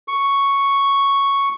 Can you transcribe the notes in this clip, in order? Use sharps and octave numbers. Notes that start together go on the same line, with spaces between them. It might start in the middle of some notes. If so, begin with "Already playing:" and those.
C#6